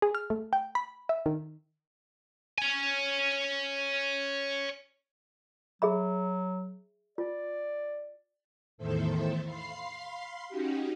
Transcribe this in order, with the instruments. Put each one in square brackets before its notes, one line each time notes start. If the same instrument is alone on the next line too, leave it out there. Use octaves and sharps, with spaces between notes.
[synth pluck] G#4
F6
A3
G5
B5
E5
D#3
[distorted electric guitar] C#5 G#5
[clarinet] F#3 [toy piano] G#4 E5 B5
[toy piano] F4 [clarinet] D5
[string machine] E2 A2 D#3 A4 C5 E5
F5 B5 C6 C7
C#4 D#4 F#4 G4